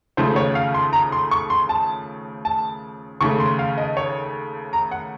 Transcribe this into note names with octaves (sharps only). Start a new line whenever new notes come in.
D#2 C#3 F3 A3 C5
C#5
F5
C6
A#5
C6
C#6
C6
A5
A5
D#2 C#3 A3 C#6
C6
F5
D#5
C#5
A#5
F#5